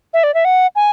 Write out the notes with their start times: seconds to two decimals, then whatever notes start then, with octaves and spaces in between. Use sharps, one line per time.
0.14 E5
0.23 D5
0.34 E5
0.45 F#5
0.76 G#5